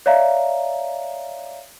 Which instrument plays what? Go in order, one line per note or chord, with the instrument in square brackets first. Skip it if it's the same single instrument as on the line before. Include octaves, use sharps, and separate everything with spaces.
[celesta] C#5 D5 E5 F5 A#5